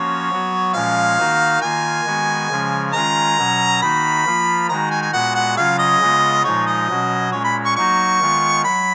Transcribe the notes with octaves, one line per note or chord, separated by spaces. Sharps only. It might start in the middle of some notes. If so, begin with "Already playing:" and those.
Already playing: F3 A#3 C#4 F#4 C#5
F#3 B3 F#4
A#2 F3 G#3 C#4 F5
D#3 A#3 D#4 F#4
D#3 A#3 F4 G#5
D#3 G#3 B3 F#4
C#3 F3 G#3 C#4
D#3 G#3 C#4 F4 A#5
B2 F#3 C#4 F#4
D#3 A#3 D#4 F#4 B5
F3 A#3 F4
D#3 G#3 D#4 F#4 A#5
G#5
G#5
A#2 G#3 B3 F#4 F#5
F#5
C#3 F#3 C#4 F4 F5
D#5
C#3 G#3 B3 F4
A#2 F3 G#3 D#4 C#5
D#5
B2 F#3 C#4 F#4
A#2 G#3 C#4 C#5
B5
C#6
F#3 A#3 D#4 F#4 C#6
D#3 G#3 B3 F4
F#3 B5